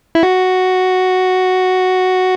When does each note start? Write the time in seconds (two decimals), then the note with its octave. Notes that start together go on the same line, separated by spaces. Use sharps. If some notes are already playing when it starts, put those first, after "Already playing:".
0.15 E4
0.23 F#4